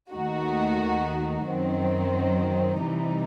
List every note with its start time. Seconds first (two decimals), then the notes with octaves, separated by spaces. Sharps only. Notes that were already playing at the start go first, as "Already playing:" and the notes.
0.11 D#2 D#3 A3 D#4 F#4
1.46 F#2 D#3 F#3 C4
2.80 C3 E3 G3 D#4